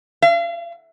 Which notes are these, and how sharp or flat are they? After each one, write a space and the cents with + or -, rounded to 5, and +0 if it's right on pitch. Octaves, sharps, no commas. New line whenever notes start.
F5 -40